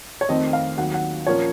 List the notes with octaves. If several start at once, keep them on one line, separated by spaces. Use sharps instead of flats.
C#5
F2 D#3 A3 C4 D#5
F5
D#2 D#3 F#3 F#5
F#5
A#2 F3 A#3 C#4 C#5